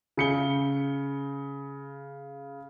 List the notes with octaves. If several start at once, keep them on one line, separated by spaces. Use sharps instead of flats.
C#3 C#7 G7